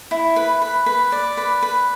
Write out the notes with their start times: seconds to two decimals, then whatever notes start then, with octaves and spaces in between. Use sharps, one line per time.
0.11 E4
0.36 B4
0.62 B4
0.86 B4
1.12 D5
1.37 B4
1.62 B4